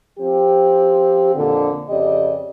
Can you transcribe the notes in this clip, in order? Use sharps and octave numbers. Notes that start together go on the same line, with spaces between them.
F3 C4 G4
F2 A#2 D3
F2 C#3 G4 D5 D#5